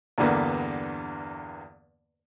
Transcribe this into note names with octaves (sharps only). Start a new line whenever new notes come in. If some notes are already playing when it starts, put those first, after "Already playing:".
E2 G2 D3 A#3 B3